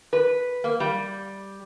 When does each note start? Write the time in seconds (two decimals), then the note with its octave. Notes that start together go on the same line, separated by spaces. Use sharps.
0.13 B4
0.64 A#3
0.80 G3